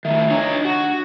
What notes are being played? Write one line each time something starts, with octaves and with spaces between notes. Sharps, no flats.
A2 D#3 E5
D4 D#4 C#5
F#4